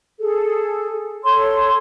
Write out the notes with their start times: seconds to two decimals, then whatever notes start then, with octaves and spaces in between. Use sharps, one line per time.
0.19 G#4 A4
1.24 A4 C#5 C6